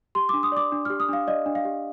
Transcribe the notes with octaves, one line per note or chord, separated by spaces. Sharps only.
G4 C6
D4 D6
D#6
D5 D6
D4
G4 F6
D#6
D4 F5
D5 D#5
D4
F5
G4